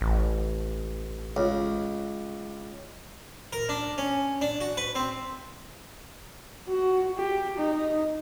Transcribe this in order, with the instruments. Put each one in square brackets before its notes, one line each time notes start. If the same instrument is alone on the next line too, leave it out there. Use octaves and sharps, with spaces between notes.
[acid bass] A1
[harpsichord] C#2
A#4
D4
C#4
D4
F#4
B4
C4
[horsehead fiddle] F#4
G4
D#4